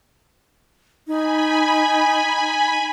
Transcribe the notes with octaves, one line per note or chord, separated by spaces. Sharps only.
D#4 G#5 B5